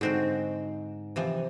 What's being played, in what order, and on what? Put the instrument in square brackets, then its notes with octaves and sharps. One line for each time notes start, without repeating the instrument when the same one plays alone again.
[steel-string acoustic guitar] G#2 [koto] D3 C4 F#4
[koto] C3 E3 F3